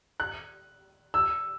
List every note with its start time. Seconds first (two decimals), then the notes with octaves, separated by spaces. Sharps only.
0.20 F#6
1.14 E6